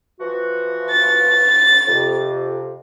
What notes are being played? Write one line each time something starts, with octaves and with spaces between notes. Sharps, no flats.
E3 F3 F#4
A6
F2 C3